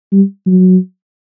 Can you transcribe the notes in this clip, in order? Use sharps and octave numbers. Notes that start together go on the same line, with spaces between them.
G3
F#3